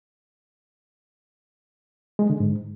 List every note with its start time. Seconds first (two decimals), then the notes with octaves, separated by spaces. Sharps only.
2.19 G#3
2.30 D3
2.40 G#2